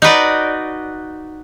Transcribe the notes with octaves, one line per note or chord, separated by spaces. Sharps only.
D#4 F#4 B4 D5